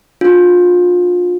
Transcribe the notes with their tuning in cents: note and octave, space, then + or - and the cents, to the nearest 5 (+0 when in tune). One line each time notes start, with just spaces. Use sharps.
D4 +0 F4 +30